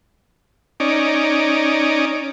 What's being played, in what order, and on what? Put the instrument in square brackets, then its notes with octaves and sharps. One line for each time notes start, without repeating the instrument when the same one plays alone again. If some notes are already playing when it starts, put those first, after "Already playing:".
[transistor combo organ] C#4 D#4 D5